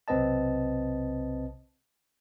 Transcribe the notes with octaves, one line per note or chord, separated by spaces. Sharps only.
B1 C3 C4 B4 D#5 A5